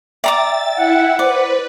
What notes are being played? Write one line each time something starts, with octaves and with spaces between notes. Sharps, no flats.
D5 E5 G5 A#5 D6 E6 A6
E4 F#5
B4 C5 D5